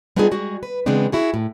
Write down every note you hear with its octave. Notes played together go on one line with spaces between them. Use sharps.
G3 B3 D4 D#4 F4 G#4
G3 G#3 F#4 G#4
B4
C#3 E3 G#3 B3 C4 D4
E4 F#4 G#4
A2